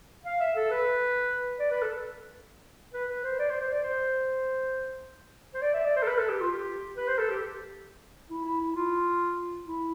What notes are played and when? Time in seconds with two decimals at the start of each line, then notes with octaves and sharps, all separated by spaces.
0.25 F5
0.40 E5
0.56 A4
0.71 B4
1.59 D5
1.71 B4
1.82 A4
2.93 B4
3.09 B4
3.24 C5
3.39 D5
3.50 C5
3.61 C5
3.72 D5
3.83 C5
5.54 C5
5.62 D5
5.74 E5
5.84 D5
5.96 C5
6.03 A4
6.07 B4
6.18 A4
6.29 G4
6.41 F4
6.51 G4
6.96 B4
7.08 C5
7.18 A4
7.30 G4
8.30 E4
8.45 E4
8.60 E4
8.75 F4
9.65 E4